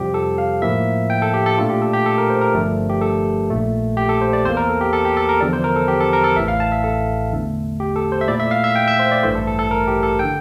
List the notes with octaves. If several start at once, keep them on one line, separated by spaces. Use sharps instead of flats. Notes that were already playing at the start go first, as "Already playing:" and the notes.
Already playing: F2 C3 G3 C4 F4 G4
A4
F5
A2 F3 A#3 E4 E5
G5
A4
G4
A4
A#2 A3 D4 F4
G4
A4
G4
A4
A#4
C5
A#4
G1 G2 F3 A3 D4
G4
A4
A#1 A#2 A3
G4
A4
C5
D5
E2 E3 A#3 C5
A#4
A4
G4
A4
G4
A4
A#4
E2 D3 F3 D5
C5
A#4
A4
G4
A4
A#4
A4
A1 A2 E3 E5
F5
A5
E5
A4
E2 D3 A3
G4
A4
C5
E5
A#2 A3 E4 D5
E5
F5
E5
G5
E5
C5
D5
A1 G2 E3 A3 C5
A4
A4
A4
A#4
G4
A4
D3 G5